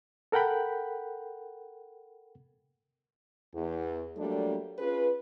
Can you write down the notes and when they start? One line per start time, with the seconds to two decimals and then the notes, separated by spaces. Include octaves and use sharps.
0.32 A4 A#4 F#5 G5 B5
3.54 E2
4.17 F#3 G3 A3 A#3 D4 A4
4.79 C#4 F4 G#4 B4